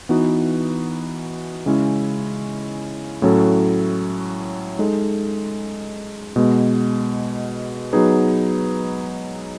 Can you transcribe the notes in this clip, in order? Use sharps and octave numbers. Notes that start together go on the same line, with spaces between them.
E3 B3 D#4 F#4
C#3 G#3 C#4 E4
A2 F#3 C#4 E4 A4
G#3 D#4 A4
B2 G#3 B3
F#3 B3 D#4 G#4 B4